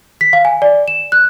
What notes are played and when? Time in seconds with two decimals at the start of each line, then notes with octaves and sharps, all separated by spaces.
0.21 B6
0.33 F5
0.45 G#5
0.62 D5
0.88 E7
1.12 F#6